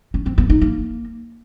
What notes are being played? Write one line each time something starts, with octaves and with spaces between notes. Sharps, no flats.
C#4
C4
B3
D#4
A#3